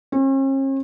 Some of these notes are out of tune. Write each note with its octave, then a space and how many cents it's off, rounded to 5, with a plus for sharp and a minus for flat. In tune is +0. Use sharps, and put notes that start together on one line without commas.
C#4 -45